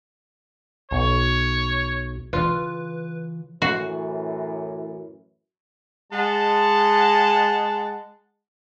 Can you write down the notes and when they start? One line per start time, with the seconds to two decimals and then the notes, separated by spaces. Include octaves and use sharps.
0.91 B1 C#5
2.33 C#3 E3 F4 B4
3.62 F#2 A2 E3 F#4
6.13 G#3 F#5 A5